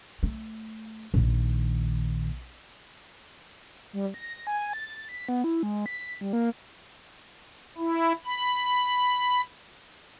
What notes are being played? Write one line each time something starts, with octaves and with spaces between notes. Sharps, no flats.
A3
A#1 D#3
G3
A#6
G#5
A6
B6
B3
E4
G#3
B6
G3
A#3
E4
B5